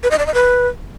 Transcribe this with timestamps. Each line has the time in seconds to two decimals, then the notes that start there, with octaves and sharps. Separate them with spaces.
0.03 B4
0.11 D#5
0.19 D5
0.26 D#5
0.34 B4